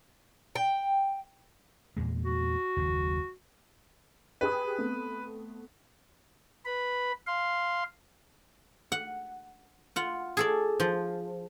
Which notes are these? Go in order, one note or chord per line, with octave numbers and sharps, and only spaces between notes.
G5
E2 A#2 G#3
F#4
F#1 D#2 F#3
G4 G#4 B4 D#6
A3 B3 C4
B4 B5
F5 C6
F#5
F4 F#5
G#4 A4 D5
F3